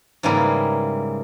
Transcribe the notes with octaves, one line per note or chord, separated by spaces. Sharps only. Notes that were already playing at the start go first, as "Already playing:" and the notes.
G#2 C#3 E3 G3 A#3 E4